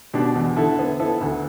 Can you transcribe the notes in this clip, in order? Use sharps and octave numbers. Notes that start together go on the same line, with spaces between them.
B2 D4 G4
E2
D3 E4 A4
B3
B3 E4 A4
D2